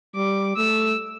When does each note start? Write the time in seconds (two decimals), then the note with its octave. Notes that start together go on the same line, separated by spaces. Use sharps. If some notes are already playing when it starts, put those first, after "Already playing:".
0.16 G3 D6
0.57 A3 E6